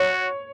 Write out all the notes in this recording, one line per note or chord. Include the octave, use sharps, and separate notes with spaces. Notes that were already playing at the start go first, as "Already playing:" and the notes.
Already playing: F#4 C#5